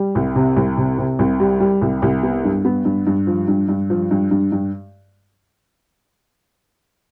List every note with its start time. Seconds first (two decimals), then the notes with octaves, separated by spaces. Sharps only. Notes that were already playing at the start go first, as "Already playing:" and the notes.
Already playing: G3
0.15 C2
0.35 C3
0.56 C2
0.77 C3
0.98 C3
1.19 C2
1.40 G3
1.60 G3
1.81 C2
2.02 C2
2.23 B3
2.44 G2
2.65 B3
2.85 G2
3.07 G2
3.27 F3
3.48 G2
3.69 G2
3.90 F3
4.11 G2
4.31 G2
4.52 G2